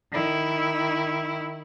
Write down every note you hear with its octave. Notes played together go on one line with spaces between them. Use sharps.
D#3 E4